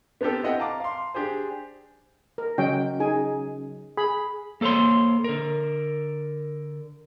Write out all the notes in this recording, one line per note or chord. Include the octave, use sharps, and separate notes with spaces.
B3 C4 D4 G4 A4
C4 E4 D#5 F#5 G5
F5 A5 A#5 D6
F5 C6
D4 G4 G#4 C5
A#4
C#3 F#3 C#4 D#5 G5
D#4 G#4 G#5
G#4 B5
A#3 A4 C5 C#5 C6
D3 A#4